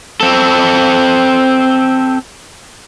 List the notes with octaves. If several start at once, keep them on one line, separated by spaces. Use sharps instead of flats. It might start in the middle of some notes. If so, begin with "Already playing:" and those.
C4 A4